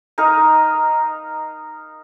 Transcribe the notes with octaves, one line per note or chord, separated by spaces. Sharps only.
D#4 A#4 D#5 F5